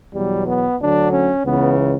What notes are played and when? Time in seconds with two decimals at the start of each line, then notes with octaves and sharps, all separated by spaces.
0.14 E2 B2 F#3 G3
0.47 B3
0.79 D2 D3 F#3 D4
1.12 C#4
1.45 C#2 C#3 E3 B3